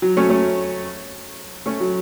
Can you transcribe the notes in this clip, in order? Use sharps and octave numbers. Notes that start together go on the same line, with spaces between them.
F#3
A3 C#4
A3 C#4
A3 C#4
F#3